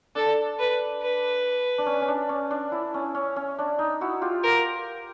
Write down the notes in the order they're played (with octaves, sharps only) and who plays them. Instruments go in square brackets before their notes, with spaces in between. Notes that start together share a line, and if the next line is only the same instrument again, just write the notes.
[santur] D4 [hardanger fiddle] A4
[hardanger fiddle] B4
B4
[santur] D4
C#4
C#4
D4
C#4
D4
E4
C#4
C#4
C#4
D4
D#4
E4 F#4
F4 G4
[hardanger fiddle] A#4